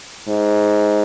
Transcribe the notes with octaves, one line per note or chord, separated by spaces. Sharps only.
G#2